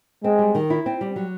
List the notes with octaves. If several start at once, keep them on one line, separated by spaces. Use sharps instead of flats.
G#3 C4
G3
D#3
E4
C4
G3
F#3